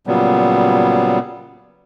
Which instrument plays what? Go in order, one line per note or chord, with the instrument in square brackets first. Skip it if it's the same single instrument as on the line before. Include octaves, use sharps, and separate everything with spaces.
[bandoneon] A#2 C#3 F#3 G3 B3